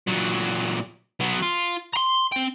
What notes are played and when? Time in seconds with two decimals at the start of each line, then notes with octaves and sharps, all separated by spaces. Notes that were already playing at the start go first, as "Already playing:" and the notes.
0.08 A#2 F#3
1.21 F#3 B3
1.42 F4
1.94 A#5 C6
2.32 C4 G5